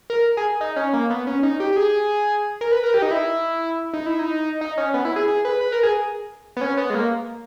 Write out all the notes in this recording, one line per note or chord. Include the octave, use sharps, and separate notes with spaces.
A#4
G#4
D#4
C#4
A#3
B3
C#4
D#4
G4
G4
G#4
A#4
B4
A#4
G4
D#4
E4
D#4
E4
D#4
D#4
C#4
B3
E4
G#4
G#4
B4
B4
A#4
G#4
B3
C#4
B3
G#3
A#3